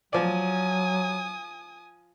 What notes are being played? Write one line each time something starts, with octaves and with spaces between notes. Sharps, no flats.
F3 F#3 D5 G#5 D#6